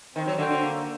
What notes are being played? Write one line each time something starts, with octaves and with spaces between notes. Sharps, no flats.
D#3 C4
F#3
D3 F#4 C5 G5
D3
A#3